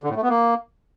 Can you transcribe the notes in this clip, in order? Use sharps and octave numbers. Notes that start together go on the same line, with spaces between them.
D3
A2
A3
B3
A#3